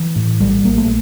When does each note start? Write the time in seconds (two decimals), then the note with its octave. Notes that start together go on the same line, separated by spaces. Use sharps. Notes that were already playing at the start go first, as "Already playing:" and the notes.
Already playing: E3
0.16 A2
0.40 A#1 G3
0.65 A#1 A#3
0.78 A3